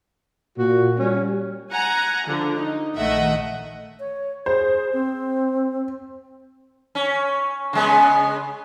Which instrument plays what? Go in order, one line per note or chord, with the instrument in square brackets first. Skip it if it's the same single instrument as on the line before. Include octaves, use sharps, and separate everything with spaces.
[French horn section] A#2 [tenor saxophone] F#4
[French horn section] G3 [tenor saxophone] C#4
[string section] F#5 G#5 A#5
D3 F3
D#4
A#1 D#3 A3 D#5 E5 F#5
[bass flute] C#5
[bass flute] G#4 [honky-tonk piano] C5
[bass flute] C4
[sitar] C#4
C#3 G#3 B3